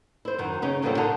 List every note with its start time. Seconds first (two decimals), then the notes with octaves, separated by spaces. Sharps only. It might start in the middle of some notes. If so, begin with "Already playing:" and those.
0.25 E4 C5
0.38 F#2 D#3
0.62 C#3 C#4 D#4
0.82 F#2 A#2 D3 F3 G3 C#4
0.97 D3 D#4 A4 A#4 D#5